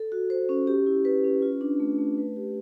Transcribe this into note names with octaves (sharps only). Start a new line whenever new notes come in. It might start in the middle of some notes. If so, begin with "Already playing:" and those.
Already playing: A4
F#4
C5
C#4
G4
E4
B4
C#4
F4
D4
A3
A3
B4
G4